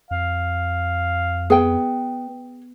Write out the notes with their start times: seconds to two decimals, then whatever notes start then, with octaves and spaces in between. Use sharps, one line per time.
0.11 F2 F5
1.50 B3 G#4 G5